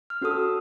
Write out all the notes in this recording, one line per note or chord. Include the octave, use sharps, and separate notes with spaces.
F6
C#4 F#4 A4 D#6
E6